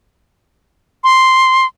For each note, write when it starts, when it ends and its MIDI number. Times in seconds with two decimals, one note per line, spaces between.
1.04 1.66 84